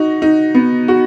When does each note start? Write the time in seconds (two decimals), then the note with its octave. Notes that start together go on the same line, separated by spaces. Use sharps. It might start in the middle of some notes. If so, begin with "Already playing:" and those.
Already playing: D#4 F#4
0.22 D#4
0.54 B3
0.88 F#4